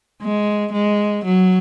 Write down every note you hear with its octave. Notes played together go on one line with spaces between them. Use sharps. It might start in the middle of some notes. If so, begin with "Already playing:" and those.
G#3
G#3
F#3